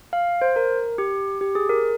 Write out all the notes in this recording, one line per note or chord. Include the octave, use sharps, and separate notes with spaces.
F5
C5
A#4
G4
G4
G#4
A#4